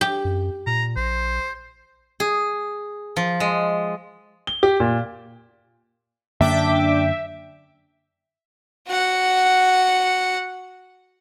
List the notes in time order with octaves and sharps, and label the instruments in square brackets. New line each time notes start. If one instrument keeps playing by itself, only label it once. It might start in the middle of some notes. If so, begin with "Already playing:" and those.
[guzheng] G4
[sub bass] F#2
[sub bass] A#2 [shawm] A#5
[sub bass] A#1 [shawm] C5
[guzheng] G#4
F3
G#3
[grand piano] G7
G4
A#2
[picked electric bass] F#2 D3 A#3 [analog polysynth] D4 G5 D6 [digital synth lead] E5
[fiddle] F#4 F#5